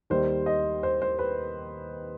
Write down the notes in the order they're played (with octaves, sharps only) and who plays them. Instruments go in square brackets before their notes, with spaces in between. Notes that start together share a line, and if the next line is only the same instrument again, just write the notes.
[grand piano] D#2 D#3 G3 C5
D#5
C5
C5
B4